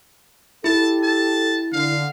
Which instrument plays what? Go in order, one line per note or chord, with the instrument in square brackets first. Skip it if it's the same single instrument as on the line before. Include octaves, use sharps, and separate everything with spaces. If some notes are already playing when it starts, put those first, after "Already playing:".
[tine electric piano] E4 [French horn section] G4 A4 [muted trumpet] A5
[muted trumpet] A5
[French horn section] D3 [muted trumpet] F5